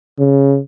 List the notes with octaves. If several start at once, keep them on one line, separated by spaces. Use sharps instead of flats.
C#3